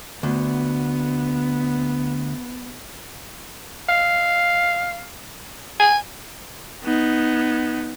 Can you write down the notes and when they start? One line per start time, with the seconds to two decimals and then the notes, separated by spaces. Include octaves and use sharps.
0.23 D2 B3
3.89 F5
5.80 G#5
6.84 B3 D#4